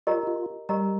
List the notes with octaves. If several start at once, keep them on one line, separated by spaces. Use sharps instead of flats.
F4 G4 A#4 D#5 A#5
F4
G3 G4 A#4 D#5 A#5